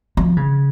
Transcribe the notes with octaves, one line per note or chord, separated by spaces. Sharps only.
F3
C#3